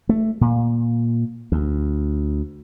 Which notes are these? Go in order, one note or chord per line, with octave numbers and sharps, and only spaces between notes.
A3
A#2
D2